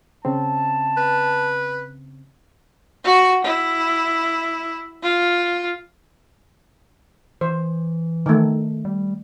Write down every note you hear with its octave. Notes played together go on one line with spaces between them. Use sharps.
C#3 C4 A5
B4
F#4
E4
F4
E3 C5
D#3 A3
G3